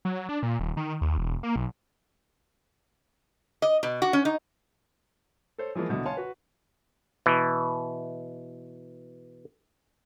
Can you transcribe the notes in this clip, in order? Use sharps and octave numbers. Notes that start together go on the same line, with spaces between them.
F#3
D4
A#2
D#1
D#3
D#2
E1
A#3
B1
D#5
B2
F#4
C#4
D#4
A4 C5 C#5
E3 F3 G#3 A#3
C2 B2 D3
C#5 F5 G#5 A5 C6
F#4 B4
B2 E3